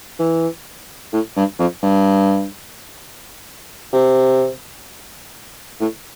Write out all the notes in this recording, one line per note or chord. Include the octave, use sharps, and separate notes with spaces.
E3
A2
G2
F2
G2
C3
A2